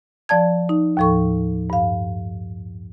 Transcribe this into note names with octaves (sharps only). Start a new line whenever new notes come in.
F3 D5 A5 G#6
D#4
D#2 A2 F3 A4 C#6
G2 F5